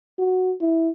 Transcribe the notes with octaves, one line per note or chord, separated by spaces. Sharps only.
F#4
E4